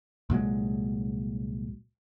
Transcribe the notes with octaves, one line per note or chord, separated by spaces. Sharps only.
C2 A#2 F#3 G#3